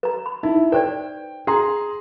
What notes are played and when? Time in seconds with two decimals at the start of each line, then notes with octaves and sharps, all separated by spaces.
0.03 B4 A#5
0.26 B5
0.43 D#4 E4
0.72 B4 C5 D5 G5
1.47 G#4 A#5 C6